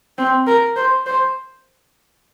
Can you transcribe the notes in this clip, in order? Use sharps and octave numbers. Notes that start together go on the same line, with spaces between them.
C4
A#4
C5
C5